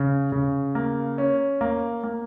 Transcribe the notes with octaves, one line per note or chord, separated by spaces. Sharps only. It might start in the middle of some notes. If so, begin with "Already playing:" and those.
Already playing: C#3
C#3
A#3
C#4
A#3
A#3